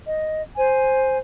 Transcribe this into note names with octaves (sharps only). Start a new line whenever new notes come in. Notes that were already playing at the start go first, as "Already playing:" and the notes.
D#5
C5 G#5